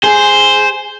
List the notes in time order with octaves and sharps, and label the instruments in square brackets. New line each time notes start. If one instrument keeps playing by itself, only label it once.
[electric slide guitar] G#4 [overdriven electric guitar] C5